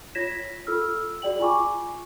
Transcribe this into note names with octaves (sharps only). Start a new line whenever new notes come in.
F4 C#5 G#6 A#6 B6 E7
F4 A4 E6 F6
F#4 G#4 D5 G5 F#7
F4 G#5 C#6 D6